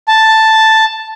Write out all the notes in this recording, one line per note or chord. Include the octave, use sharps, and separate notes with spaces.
A5